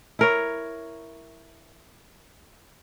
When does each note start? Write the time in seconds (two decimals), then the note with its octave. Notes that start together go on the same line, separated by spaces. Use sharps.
0.19 E4 A#4 C#5